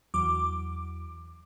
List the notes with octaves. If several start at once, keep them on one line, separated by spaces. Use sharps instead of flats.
E2 F#3 D6